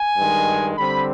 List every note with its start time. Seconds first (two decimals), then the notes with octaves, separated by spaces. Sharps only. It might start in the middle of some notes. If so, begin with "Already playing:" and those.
Already playing: G#5
0.17 G2 D#3 G#3
0.76 D3 G3 C4 B5